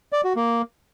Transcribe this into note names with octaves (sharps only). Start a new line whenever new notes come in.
D5
F#4
A#3